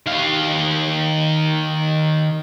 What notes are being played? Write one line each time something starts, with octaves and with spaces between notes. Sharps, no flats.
D#3 F5